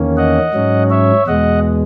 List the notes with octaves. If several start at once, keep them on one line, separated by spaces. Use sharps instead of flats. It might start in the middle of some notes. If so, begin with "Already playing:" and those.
Already playing: E2 D#3 A#3 C#4
D#5 F#5
G#2 F#3 C#4
C#5 E5
E2 B2 G#3 D#5 F#5